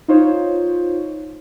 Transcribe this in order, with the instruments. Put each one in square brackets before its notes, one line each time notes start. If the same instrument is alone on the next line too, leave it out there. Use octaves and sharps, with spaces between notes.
[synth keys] D#4 F4 C5 C#5